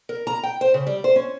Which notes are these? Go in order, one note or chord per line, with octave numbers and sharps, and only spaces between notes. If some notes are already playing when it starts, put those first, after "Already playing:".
A#4
A#5
G5
C5
C#3
G3
C5
C#4